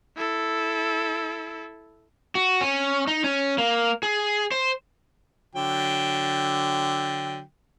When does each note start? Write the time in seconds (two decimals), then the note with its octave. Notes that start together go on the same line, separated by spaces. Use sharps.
0.17 E4 A4
2.35 F#4
2.61 C#4
3.07 D#4
3.24 C#4
3.58 A#3
4.03 G#4
4.52 C5
5.55 D3 F#3 G5